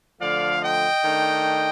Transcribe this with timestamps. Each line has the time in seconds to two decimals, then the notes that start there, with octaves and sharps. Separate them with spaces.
0.21 D3 F3 A3 D5 F5
0.62 D#5 G5
1.04 D#3 A3 D4